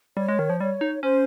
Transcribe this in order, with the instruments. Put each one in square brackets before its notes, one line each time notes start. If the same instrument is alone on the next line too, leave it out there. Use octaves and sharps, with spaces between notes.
[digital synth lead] G3 [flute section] C#5
[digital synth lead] G#3
D#3
F3
[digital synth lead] G3 [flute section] C#5
[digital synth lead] D#4
[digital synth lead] C#4 [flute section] C5